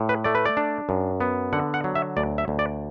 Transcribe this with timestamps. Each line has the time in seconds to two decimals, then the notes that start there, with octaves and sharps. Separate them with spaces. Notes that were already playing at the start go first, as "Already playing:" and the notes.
Already playing: A2
0.09 B4
0.24 A3 D5
0.35 B4
0.45 D5
0.57 D4
0.89 F#2
1.20 B3
1.53 D3 F#5
1.74 F#5
1.84 F#3
1.95 E5
2.17 D2 D5
2.38 E5
2.48 D2
2.59 D5